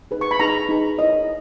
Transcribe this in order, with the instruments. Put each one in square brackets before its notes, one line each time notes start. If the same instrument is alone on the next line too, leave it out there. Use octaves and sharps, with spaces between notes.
[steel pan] D#4 G#4 B4
C#6
B5
D#4 G#4 B4 A#5
D#4 G#4 B4
E4 A#4 C#5 D#5